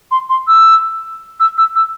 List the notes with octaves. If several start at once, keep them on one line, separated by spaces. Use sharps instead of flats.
C6
C6
E6
E6
E6
E6